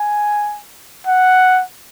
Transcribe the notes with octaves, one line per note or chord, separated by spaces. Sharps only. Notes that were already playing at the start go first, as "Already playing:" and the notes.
Already playing: G#5
F#5